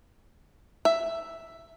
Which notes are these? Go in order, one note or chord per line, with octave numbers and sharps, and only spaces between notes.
E5